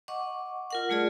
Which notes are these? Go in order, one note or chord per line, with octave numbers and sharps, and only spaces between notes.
D#5 F#5 C#6 D6
F4 A#4 F#5
G3 A3 F4 G#4 D5